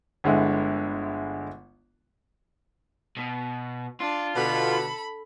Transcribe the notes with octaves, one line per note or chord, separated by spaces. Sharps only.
G1 D3 G#3 E4
B2
D4 F4
B2 D3 A4 B5